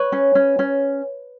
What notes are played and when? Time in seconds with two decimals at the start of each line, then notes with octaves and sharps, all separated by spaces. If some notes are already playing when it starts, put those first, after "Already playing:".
Already playing: B4 C#5
0.12 C#4
0.35 C#4
0.59 C#4